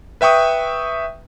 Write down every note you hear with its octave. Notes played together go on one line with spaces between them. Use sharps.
B4 E5 G5 C#6 D#6